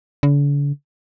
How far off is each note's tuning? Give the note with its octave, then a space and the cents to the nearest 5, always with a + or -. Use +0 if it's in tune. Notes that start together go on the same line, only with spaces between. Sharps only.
D3 -45